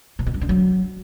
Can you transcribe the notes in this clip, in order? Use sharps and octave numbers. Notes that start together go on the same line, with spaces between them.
A#2
B2
G2
D3
F#3